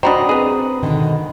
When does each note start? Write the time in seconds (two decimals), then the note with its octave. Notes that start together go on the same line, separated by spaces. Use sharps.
0.03 D4 F#4 C5 D#5 G5 A#5 B5 D#6
0.29 C4 G#4 B4
0.83 B2 D3 D#3